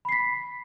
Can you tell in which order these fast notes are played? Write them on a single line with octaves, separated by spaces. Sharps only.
B5 C7 B6